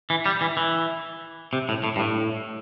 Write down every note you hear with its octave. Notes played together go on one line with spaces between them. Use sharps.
E3
G3
E3
E3
C3
A2
A2
G2
A2